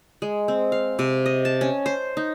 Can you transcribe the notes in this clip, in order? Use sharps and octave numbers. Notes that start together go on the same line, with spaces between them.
G#3
C4
F5
C3
D#5
A5
C#4
C5
D#4